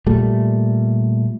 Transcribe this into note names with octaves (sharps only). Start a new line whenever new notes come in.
A#2 G3 A3